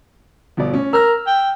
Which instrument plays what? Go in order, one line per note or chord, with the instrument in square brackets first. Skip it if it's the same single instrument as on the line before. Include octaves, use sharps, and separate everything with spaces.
[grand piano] G1 B2 D5
C#4
[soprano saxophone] A#4 [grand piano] E6 F6
[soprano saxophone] G5